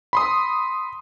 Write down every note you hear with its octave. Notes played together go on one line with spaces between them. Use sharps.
B5 C6 D#6